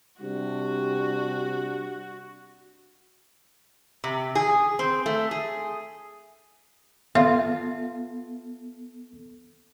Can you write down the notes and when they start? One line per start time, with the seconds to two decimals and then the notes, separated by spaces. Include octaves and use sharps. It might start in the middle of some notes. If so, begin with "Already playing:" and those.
0.21 C3 G3 D4 F#4
4.04 C3
4.35 G#4
4.79 C4
5.06 A3
5.31 G#4
7.15 B3 F4 A4 E5